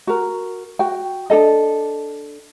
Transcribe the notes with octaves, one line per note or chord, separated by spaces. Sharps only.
F#4 A#4
F#4 G5
D4 G#4 A4 D#5